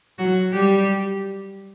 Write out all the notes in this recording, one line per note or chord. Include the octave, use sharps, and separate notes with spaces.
F#3 F#4
G3 G4